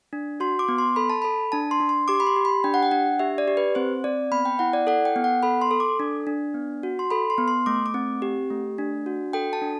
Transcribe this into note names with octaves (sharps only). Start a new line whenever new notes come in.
D4
F#4 C6
D6
B3
C6
A4 B5
A5
A4 B5
D4 A5
C6
D4
C6
G4 D6
B5
C6
G4
B5
D4 G5
F#5
G5
D4 F#5
G4 E5
D5
G4
B4
C4 C5
C4 D5
B3 B5
G5
E4 F#5
D5
A4 F#5
G5
B3
F#5
A4 B5
C6
A4
D6
D4
D4
B3
F#4
C6
A4 B5
C6
B3
C6
A3 D6
D6
C4
G4
A3
D4
F#4
A4 G5
A5
D4